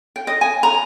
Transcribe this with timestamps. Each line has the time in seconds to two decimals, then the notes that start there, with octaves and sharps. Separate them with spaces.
0.16 G5
0.27 D#5
0.41 G#5
0.63 A#5